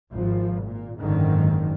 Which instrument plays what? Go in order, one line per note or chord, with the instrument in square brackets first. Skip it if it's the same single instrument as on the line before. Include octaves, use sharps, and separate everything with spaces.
[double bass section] G#1 F3
A#2
F#1 G#2 D3 D#3